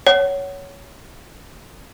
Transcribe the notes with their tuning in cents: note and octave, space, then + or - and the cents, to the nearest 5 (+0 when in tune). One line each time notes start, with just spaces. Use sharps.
C#5 +10 F#5 +20